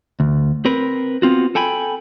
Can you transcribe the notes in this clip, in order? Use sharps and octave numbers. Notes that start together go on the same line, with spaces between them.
D2
C4 A#4 B4
B3 C4 F4 F#4
A4 G5 G#5 B5